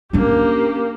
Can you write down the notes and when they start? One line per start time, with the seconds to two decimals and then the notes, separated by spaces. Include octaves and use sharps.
0.13 A#3 C#4 D4 G4